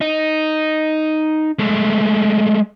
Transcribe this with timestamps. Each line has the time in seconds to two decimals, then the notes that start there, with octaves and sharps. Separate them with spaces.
0.01 D#4
1.59 G#3 A3